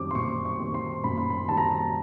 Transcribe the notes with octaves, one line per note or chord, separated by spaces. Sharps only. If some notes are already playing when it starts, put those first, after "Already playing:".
Already playing: F#2 D#3 G3 C4 D6
C6
F#2 C#6
C#6
D#3 G3 C4
C6
F#2 B5
C6
B5
D#3 G3 C4 A5
A#5
A5